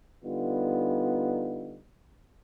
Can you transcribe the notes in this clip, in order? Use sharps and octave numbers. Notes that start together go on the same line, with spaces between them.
D3 G3 B3 D#4 F4